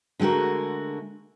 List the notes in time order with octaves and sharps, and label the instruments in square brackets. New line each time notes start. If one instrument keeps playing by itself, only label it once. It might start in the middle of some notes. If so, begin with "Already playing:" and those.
[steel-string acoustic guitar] D3 G#3 A3 F#4 A#4